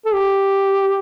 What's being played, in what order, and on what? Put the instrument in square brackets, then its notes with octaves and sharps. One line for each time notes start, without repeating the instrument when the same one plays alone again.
[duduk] A4
G4